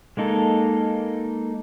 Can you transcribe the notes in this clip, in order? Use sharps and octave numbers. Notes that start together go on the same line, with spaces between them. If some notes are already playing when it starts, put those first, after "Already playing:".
G#3 A#3 D#4 A4